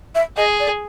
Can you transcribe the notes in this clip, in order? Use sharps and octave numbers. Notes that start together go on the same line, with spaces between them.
E5
G#4 D#5
D5